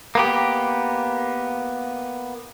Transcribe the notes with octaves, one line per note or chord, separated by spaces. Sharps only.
A#3 B3 G4